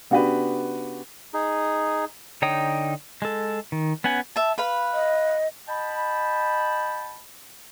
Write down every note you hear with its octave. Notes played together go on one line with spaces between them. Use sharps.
C#3 B3 D4 F#4 G4 B4
D#4 G#4
D3 D#4 C#5 G5 D#6
G#3 A4
D#3
B3 C#4 F#5 G#5
E5 A5
B4 F5 B5
D#5
D#5 G5 A5 B5